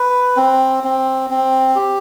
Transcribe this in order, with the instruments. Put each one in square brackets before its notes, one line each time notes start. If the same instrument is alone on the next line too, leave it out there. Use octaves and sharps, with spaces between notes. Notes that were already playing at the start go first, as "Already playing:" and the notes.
Already playing: [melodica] B4
C4
C4
C4
G4